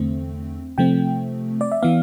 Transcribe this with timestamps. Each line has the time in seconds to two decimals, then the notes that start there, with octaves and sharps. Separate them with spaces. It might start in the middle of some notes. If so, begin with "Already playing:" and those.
Already playing: E2 D3 A3 C4
0.78 C3 F3 A3 C4 G5
1.61 D5
1.72 E5
1.82 E3 B3 F5